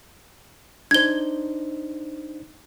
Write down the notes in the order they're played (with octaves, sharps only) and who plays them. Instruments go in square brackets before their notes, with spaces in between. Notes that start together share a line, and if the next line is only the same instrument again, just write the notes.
[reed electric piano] D4 D#4 C5 [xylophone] G#6 G7